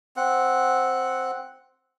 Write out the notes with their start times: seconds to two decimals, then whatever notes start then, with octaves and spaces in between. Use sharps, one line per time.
0.17 C4 F#5